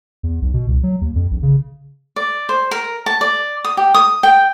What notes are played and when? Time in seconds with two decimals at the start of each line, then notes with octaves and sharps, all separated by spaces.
0.23 E2
0.42 B1
0.54 B2
0.68 C2
0.83 F#3
1.01 D#2
1.15 F2
1.31 A#1
1.43 C#3
2.16 D5
2.49 C5
2.71 A#4
3.06 A5
3.21 D5
3.65 D#6
3.77 G4
3.94 D#6
4.23 G5